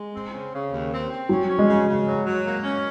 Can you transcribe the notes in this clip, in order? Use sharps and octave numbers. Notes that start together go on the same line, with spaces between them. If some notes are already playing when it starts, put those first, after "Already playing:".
Already playing: G#3
C4
C#3
C#3
D#2
C4
C4
F#3 C#4
C#4
G#3
C#3
C#3
F#3
F#3
A#3
C#4